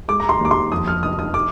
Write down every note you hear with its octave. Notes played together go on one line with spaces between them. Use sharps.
G#3 D6
A#5
C6
D#2
D6
C6
F2 D#6
F6
F1 D#6
D#6
D6